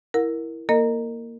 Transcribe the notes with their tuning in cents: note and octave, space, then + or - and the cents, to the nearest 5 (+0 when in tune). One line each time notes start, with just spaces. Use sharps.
E4 +0 A#4 +0 F#5 -30
A#3 +0 A#4 -30 D#5 -20